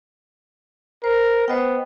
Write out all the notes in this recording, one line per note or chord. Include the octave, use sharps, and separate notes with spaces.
A#4 C5
B3 C5 D#5 G5